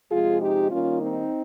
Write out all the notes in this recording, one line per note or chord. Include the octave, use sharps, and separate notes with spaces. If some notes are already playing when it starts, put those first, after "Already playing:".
C3 F3 G#3 F4 G#4
D#4 G4
D#3 G3 A#3 C#4 F4
C4 D#4